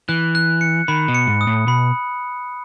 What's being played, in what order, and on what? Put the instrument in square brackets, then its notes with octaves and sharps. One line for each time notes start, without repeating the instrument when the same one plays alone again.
[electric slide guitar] E3 [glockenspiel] F#6
[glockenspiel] F#6
C#7
[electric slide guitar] D#3 [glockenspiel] B5
[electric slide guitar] B2
[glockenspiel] C#7
[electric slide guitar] G#2
[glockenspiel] D#6
[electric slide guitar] A2
[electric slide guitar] B2 [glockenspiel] B5